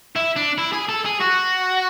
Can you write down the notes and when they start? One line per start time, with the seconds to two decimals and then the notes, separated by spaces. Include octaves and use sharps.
0.16 E4
0.36 D4
0.58 E4
0.73 G#4
0.89 A4
1.05 G#4
1.20 F#4